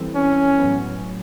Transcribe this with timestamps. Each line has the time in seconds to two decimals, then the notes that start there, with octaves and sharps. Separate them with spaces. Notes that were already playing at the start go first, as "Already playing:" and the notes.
Already playing: E3 G3 C4 E4 A4
0.15 C#4
0.59 A2 F#3 B3